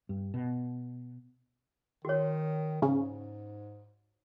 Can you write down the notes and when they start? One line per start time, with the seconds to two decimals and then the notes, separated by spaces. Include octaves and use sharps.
0.09 G2
0.34 B2
2.05 D#3 F#4 C#5
2.82 G#2 C#3